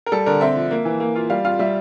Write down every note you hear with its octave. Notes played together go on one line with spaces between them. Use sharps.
A#4
G3 A4
D3 A#4
C4 E5
F3
A#3
E3
A#3
F4
G3 F5
F4 F5
G3 E5